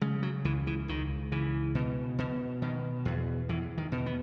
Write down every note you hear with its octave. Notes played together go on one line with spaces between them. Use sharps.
C#3 G#3
F#3
C#2 E3
E3
C#2 D#3
C#3 E3
B2
B2
B2 D#3
E2
E2 E3
D#3
B2
B3